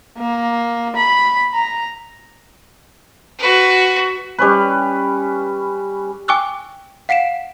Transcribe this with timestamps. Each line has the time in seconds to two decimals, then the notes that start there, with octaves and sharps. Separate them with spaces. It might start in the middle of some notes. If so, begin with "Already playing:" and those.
0.18 A#3
0.96 B5
1.54 A#5
3.39 F#4 B4
4.39 G3 C#4 B4
6.28 G5 G#5 C#6 D6 E6 F#6
7.09 F5 F#5 B6 D7 E7